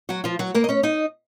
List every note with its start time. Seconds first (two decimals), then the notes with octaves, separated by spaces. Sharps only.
0.09 F#3 F#4
0.24 F3 F4
0.39 F#3 F#4
0.54 A#3 A#4
0.64 D#5
0.69 C#4 C#5
0.83 D#4 D#5